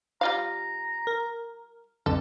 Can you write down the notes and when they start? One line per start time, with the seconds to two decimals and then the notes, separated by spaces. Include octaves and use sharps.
0.21 G3 F4 F5 A#5
1.07 A#4
2.06 B1 F2 D3 A4